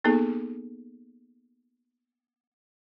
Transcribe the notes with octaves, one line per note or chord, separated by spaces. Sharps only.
A#3 B3 D#4 G#4 A4